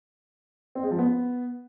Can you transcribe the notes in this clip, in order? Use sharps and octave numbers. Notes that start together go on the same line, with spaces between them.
C4
G#3
F3
B3